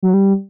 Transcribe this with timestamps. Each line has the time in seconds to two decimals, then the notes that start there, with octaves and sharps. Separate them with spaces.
0.03 F#3
0.14 G3